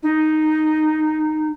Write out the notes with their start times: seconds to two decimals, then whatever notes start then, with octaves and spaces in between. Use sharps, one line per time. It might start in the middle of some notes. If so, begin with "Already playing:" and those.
0.03 D#4